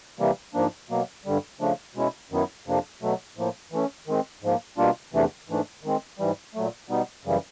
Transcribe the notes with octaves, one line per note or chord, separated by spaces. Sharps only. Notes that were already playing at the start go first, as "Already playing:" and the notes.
C3 E3 G3 A#3
G#2 F3 A#3 D4
B2 F#3 A#3
G2 D3 G3
C#3 F3 A3 D4
B2 G#3 C#4 E4
F#2 D#3 F#3 B3 E4
F2 C3 F3 A#3 D4
B2 F#3 A3
A2 F3 A#3
E3 A3 C#4
D#3 G#3 C4
G#2 F3 A#3
B2 G3 A#3 D4 F4
E2 C3 E3 A3 D4
G#2 E3 A3 D4
D#3 G#3 C4
G#2 E3 G3
A#2 F#3 A3
B2 G3 B3 D#4
F#2 C#3 E3 G3